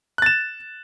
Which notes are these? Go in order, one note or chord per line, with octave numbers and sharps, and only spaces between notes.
F#6 A6 E7